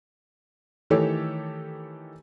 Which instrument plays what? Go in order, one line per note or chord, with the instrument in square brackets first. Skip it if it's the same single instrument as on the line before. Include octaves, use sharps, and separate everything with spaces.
[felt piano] D#3 E3 A3 G4 A4 C#5